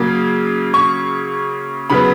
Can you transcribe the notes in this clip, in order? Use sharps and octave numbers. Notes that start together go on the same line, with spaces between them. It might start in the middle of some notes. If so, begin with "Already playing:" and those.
Already playing: C#3 F#3 A#3
C#6
C#3 F#3 B3 B5